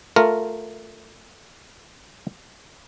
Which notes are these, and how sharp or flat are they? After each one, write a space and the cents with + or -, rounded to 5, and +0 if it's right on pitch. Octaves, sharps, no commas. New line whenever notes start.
A3 +10 F4 +10 A#4 +0